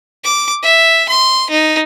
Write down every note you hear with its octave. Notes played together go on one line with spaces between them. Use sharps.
D6
E5
C6
D#4